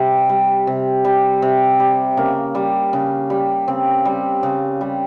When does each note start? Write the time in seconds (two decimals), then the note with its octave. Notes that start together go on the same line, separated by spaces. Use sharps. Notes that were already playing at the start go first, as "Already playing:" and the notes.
Already playing: C3 G3 C4
0.29 G3
0.67 C3
1.05 G3
1.42 C3
1.80 G3
2.17 C#3 A#3
2.55 G3
2.93 C#3
3.30 G3
3.68 C#3 C4
4.05 G3
4.43 C#3
4.81 G3